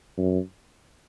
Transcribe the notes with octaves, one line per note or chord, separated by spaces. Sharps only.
F#2